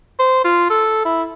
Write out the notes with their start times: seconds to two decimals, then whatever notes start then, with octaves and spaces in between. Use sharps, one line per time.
0.19 C5
0.45 F4
0.70 A4
1.05 E4